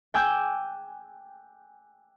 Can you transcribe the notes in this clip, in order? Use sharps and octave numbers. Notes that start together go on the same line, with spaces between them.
G5 G#5 D6 E6 F#6 G6